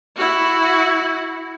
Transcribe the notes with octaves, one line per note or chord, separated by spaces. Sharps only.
E4 F#4